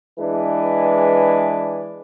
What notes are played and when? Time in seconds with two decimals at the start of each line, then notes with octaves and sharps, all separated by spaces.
0.19 E3 G#3 D4 B4